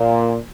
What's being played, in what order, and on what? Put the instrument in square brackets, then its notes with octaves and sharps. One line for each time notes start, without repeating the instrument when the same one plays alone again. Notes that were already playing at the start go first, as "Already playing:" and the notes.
Already playing: [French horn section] A#2